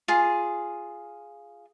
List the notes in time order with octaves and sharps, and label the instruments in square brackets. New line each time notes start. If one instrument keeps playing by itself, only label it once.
[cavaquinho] F4 G#4